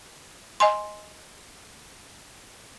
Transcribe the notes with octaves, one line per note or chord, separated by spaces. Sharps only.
D#5 G#5 C6